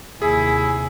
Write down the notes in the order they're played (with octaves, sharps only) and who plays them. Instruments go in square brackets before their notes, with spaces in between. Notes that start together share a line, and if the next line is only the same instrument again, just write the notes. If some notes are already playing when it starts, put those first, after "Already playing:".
[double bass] D#2 C3 [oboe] E4 [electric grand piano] G#4 [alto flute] G#5